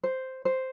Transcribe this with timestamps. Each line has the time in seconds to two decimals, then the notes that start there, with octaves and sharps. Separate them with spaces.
0.04 C5
0.45 C5